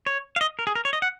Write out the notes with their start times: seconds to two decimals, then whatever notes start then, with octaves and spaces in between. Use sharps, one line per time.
0.06 C#5
0.36 F5
0.41 D#5
0.59 A#4
0.67 G#4
0.75 A#4
0.85 C#5
0.93 D#5
1.02 F#5